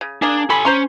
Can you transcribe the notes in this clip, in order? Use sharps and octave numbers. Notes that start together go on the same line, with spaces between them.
C#3
A#3 D4 G#4
C#4 A4 G#5 B5 C6
C#4 C5 A#5 C6